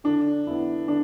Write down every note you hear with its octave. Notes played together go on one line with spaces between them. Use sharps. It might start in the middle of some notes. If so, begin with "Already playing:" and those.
D3 D4
B3 E4
D3 D4